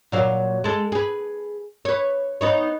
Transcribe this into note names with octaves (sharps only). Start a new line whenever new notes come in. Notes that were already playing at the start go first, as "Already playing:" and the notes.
A#2 F#3 F5
G#3 A4
G#4 B4
B4 C#5
B3 D#4 C#5